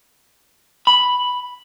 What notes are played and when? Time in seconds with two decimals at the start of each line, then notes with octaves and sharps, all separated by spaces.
0.87 B5